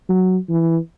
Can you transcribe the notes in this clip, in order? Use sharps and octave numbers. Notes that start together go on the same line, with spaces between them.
F#3
E3